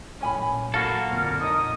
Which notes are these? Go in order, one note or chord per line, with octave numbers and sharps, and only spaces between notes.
A1 F#2 A#2 C#4 G#5 B5
A#3 F#4 A4 F5 F6
F2 A#2 D3
D#4 A#4 D#5 D#6